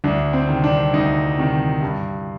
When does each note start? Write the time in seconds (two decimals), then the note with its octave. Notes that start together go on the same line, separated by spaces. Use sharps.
0.04 D2 D4
0.33 C4
0.49 C3 D#3
0.64 D4
0.93 D2 D#4
1.38 C3 D#3
1.82 G2